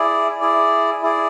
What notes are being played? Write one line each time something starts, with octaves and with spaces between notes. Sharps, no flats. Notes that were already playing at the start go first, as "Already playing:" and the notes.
Already playing: E4 G#4 D5
E4 G#4 D5
E4 G#4 D5